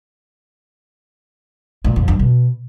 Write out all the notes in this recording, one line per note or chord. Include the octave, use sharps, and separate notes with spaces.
A#2
F2
G2
B2